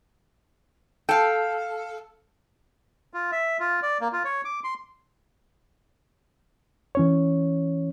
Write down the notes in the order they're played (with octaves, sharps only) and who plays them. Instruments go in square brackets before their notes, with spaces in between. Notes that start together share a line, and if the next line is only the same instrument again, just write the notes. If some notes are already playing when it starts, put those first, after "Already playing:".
[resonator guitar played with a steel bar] A4 [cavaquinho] F5 G5
[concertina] F4
E5
F4
D5
A#3
F4
C#5
D6
C6
[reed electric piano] E3 C#4 C#5